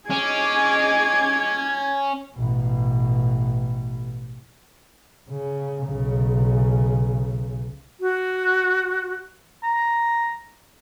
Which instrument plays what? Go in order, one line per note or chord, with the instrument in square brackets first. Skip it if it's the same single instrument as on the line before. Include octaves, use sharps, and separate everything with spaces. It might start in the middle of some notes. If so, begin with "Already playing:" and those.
[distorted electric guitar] C#4 [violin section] G#4 D#5 D6 [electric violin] G#6
[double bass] A1 B2
C#3
B1 C#3
[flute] F#4
[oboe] A#5